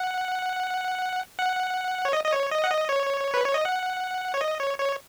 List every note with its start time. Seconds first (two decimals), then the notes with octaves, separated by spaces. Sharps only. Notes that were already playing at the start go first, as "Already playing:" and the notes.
Already playing: F#5
1.39 F#5
2.05 C#5
2.13 D#5
2.24 D#5
2.33 C#5
2.51 D#5
2.64 F#5
2.71 D#5
2.89 C#5
3.34 B4
3.45 C#5
3.54 D#5
3.65 F#5
4.34 C#5
4.41 D#5
4.60 C#5
4.78 C#5